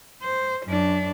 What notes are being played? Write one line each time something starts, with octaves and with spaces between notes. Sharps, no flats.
C5
F#2 D4